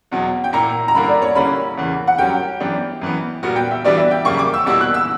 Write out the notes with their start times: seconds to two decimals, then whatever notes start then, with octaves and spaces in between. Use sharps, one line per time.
0.11 E2 B2 F#3
0.44 G5
0.53 A#2 A#3 E4 A#5
0.88 A#5
0.95 G2 D3 A#3 E4 A#4 B5
1.09 D5
1.22 C#5
1.35 D3 G3 A#3 C#4 E4 B5
1.77 E2 C#3 E3 A#3
2.07 F#5
2.18 G2 F#3 C#4 G4 A#4 G5
2.60 F#2 E3 B3 D4 G4
3.02 F#2 E3 B3
3.43 A#2 G3 B3 F#4 A#4
3.56 G5
3.71 E5
3.84 E3 G3 B3 D4 F#4 D5
3.97 E5
4.11 G5
4.25 F#2 C#3 G3 A#3 C#6
4.39 D6
4.54 E6
4.66 B2 G3 A#3 E4 E6
4.81 F#6
4.94 E6